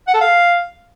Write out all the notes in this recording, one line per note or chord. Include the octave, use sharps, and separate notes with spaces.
F#5
A4
F5